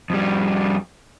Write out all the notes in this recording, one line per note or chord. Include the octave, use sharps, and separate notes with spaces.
F2 G3